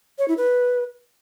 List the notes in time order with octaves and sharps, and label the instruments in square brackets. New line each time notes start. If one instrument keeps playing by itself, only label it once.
[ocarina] C#5
E4
B4